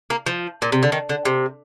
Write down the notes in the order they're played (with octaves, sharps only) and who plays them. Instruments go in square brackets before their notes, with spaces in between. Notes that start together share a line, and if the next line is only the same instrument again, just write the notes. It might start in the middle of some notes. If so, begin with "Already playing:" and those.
[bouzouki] A#3
F3
A#2
C3
D3
D#3
D3
C3